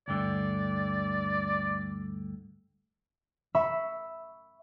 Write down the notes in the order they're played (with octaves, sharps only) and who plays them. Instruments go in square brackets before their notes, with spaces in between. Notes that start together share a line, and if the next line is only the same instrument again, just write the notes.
[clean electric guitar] D2 G2 D3 [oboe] D5
[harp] E5 B5 C#6 E6